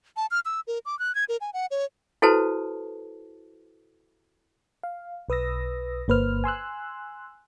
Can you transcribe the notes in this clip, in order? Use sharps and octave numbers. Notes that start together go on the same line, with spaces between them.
A5
F6
E6
A#4
D6
F#6
G#6
A#4
G#5
F#5
C#5
E4 F#4 A4 B4 C5 A5
F5
B1 B4 D#6 E6 A#6
G1 A#3 B4 C5 F6
G#5 C6 E6 F#6